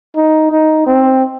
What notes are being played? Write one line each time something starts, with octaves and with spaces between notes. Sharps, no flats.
D#4
D#4
C4